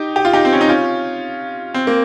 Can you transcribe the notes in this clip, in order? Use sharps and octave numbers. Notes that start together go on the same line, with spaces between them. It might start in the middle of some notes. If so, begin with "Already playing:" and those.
Already playing: D#4 G4
G4
F4
D#4 G4
C4
C#4
D#4
C#4 F4
C4
A#3